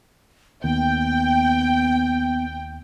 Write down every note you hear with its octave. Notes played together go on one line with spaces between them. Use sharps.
D#2 B3 G5